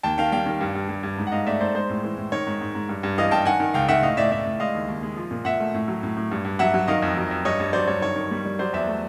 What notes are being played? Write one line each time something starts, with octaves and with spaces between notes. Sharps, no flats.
D#2 G5 A5
D#3 F5 G5
G3 F5 G5
D#3
G2
G2
G2
G2
G#2
F#5
G#2 D#5 F5
A3 D5 E5
G#2 C5 D5
G#3 C5
A2
E3
A2
D#3 C#5
G#2
G#2
G#2
G2
G2
E3 D#5 F5
G2 G5 A5
D#3 F#5 G#5
D#3
C#2 F5 G5
D#3 E5 F#5
A2 D#5 F5
A2 D5 E5
A2 D5 E5
A2
G#3 D#5 F5
D#2
D#2
G#3
F3
A#2
A#2 E5 F#5
A3
A2
F#3
A2
A2
G2
G2
F#3 E5 F#5
F#3
D#3 D#5 F5
F2
F#3
F2
G2 C#5 D#5
G2
F#3 C5 D5
G2 C#5
D#3 C#5
D#3
G3
G3
F#3 C5 D5
E2 D5 E5
A3